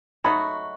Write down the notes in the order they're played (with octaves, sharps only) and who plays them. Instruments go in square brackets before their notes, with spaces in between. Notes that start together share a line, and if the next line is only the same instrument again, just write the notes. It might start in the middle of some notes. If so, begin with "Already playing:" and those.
[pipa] F#3 A3 D#4 F#4 [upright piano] B5